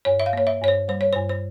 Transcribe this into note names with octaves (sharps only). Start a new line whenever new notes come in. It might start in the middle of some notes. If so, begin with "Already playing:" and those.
G2 C#5
E5
F5
A#3 C#5
E5
G2 C#5
C5
G3 C5
C#5
G2 C5
C5